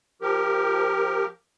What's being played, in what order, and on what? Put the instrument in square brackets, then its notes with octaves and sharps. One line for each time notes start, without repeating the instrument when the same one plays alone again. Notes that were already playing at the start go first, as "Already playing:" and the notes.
[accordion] F3 G4 A#4